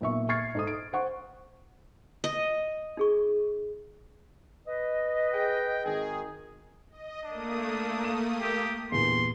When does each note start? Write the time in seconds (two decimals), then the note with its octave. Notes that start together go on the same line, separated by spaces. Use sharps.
0.01 B1 A#2 E5 C#6
0.29 C#6 F6 G#6 A6 C7 C#7
0.55 G#2 A4 D#6
0.67 D7
0.93 C5 F#5 C#6
2.24 D#5
2.97 D#4 G#4 C#6
4.65 B4 D#5
5.33 G#4 G5
5.85 G#1 D#3 G#4
6.90 D#5
7.24 A3 A#3 D4 D#6
8.04 F5 E7
8.40 G4
8.92 E2 G2 A#2 C6